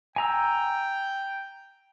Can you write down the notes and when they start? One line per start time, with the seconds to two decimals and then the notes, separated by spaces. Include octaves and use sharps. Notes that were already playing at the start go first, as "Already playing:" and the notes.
0.16 G5 G#5 A#5 E6